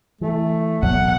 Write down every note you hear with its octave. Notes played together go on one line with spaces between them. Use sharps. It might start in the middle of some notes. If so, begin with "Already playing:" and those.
E3 A3
B2 F#3 B3 F#5